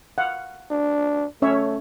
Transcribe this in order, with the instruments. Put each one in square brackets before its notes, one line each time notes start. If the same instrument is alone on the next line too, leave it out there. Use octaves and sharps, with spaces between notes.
[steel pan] F5 F#5
[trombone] D4
[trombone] A3 [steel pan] C#4 C#5 E5